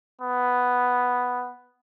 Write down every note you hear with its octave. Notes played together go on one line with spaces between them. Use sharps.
B3